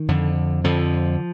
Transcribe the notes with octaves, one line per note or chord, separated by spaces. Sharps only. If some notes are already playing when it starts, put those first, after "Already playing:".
Already playing: D#3
F2 D3
F2 D3 F3